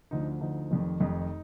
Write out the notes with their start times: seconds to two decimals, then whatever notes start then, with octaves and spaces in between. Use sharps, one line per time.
0.11 D2 D3 F3 D#4
0.41 D2 D3 F3 D#4
0.71 F1 F2 D#3
1.00 F1 F2 D#3 D#4